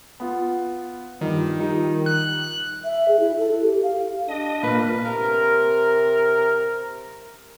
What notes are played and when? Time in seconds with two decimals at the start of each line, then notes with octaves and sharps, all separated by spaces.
0.20 B3 F4
1.21 G2 D#3 F3
1.58 F3 G3 D#4
2.06 F#6
2.84 E5
3.08 G#4
3.20 E4
3.39 A4
3.62 G4
3.83 F5
4.28 D4 D#5
4.63 A#2 A#3 B4
5.06 C3 A#4